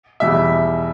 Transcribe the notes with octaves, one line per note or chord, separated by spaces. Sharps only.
E2 B2 G3 E5